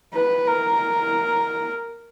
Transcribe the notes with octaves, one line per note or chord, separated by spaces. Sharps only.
B4
A#4